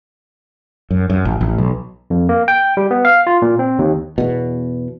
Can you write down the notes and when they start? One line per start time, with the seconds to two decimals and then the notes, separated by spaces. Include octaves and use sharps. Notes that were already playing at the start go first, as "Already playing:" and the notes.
0.90 F#2
1.10 F#2
1.25 A1
1.41 A1
1.58 B1
2.10 F2
2.29 A#3
2.48 G5
2.77 G3
2.91 B3
3.05 F5
3.27 F4
3.42 A#2
3.59 C4
3.79 D#2
4.18 E2 B2